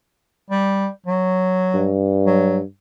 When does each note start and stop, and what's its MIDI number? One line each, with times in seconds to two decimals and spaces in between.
0.51 0.87 55
1.07 1.92 54
1.74 2.64 43
2.26 2.58 54